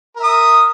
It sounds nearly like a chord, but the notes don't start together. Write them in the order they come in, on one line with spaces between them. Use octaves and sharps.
A#4 E5 D#6